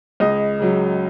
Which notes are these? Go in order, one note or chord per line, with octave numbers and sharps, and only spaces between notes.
C#2 D#5
C#3 F#3